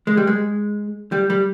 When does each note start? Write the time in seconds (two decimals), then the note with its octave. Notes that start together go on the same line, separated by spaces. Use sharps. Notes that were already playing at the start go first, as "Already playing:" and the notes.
0.07 G#3
0.17 G3
0.27 G#3
1.12 G3
1.30 G3